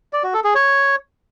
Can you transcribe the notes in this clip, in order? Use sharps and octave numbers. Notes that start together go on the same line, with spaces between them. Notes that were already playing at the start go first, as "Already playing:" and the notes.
D5
F#4
A4
G#4
C#5